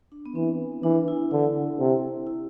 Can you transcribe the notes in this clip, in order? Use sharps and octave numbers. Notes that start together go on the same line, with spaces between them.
D4
B3
E3 C4
E3 D4
E4
D3
C3
E4